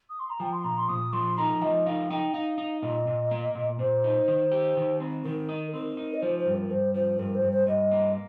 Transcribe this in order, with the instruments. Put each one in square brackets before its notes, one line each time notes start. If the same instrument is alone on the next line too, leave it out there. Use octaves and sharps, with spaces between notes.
[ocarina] D#6
C6
A#5
[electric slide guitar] F3 [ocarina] G5
[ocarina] C6
[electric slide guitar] A#2 [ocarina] A#5
[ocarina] C6
[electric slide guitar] A#2 [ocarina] D#6
[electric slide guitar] F3 [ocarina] C6
[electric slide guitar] D#4 [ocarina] A#5
[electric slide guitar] F3 [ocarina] D#5
[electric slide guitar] D#4 [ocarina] F5
[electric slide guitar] D#4 [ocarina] G5
[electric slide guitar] D#4 [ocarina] F5
[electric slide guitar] D#4
[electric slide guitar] A#2 [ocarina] D#5
[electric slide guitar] A#2
A#3
A#2
[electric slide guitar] A#2 [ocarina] C5
[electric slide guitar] D#4
D#3
G4
D#3
C4
[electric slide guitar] D#3 [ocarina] A#4
[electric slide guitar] D#4
[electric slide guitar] C4 [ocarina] A#4
[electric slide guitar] D#4
[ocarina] D#5
[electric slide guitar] F3 [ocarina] C5
[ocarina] C5
[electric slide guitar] G2
[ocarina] A#4
[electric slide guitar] G2 [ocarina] C5
[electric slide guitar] F3 [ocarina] C5
[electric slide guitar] G2 [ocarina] A#4
[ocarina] C5
[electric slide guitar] G2
[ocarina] C5
[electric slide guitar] G2 [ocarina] D#5
[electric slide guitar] A#3